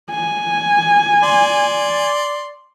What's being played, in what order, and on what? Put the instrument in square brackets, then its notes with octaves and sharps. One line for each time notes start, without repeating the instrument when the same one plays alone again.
[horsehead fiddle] G#5
[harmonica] D5 C6